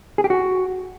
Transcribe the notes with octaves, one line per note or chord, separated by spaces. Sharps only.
G#4
G4
F#4